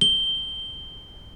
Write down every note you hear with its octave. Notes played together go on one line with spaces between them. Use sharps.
G7